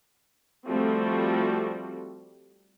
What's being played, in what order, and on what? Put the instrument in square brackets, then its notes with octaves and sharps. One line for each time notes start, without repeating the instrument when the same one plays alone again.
[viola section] F3 G3 A3 C4 F#4